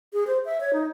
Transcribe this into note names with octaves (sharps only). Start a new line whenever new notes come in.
G#4
C5
E5
C#5
D#4